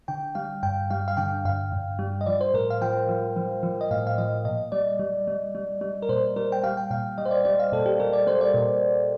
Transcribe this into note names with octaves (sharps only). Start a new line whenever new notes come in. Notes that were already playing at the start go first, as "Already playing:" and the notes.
D3 G5
G3 F5
G2 G5
G3 F5
F5
D3 G5
G2 F5
G2
G3
D#5
F3 D5
C5
A2 A#4
F5
F3 G5
F3
F3
F3
D#5
A2 F5
F5
F3 D#5
A#2 D#5
G3 D5
G3
G3
G3
G3
A#4
A#2 C5
G3 A#4
G5
G3 F5
G5
A#2 F5
G3 D#5
C5
D5
G3 D5
F5
A#2 A4
G4
G3 A#4
D5
G3 C5
D5
A#2